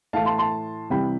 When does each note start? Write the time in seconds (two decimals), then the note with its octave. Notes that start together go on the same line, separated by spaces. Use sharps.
0.13 A2 E3 A3 F5 A5
0.25 A5 C6
0.38 A5 C6
0.90 C3 E3 G3 G5 B5